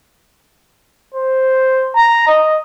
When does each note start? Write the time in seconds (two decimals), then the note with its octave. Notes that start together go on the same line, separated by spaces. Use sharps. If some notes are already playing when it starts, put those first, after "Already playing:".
1.15 C5
1.96 A#5
2.28 D#5